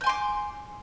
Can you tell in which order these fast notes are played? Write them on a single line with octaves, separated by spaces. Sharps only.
G6 G#5 C6 D6